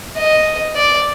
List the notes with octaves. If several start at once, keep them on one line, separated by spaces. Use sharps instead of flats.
D#5
D5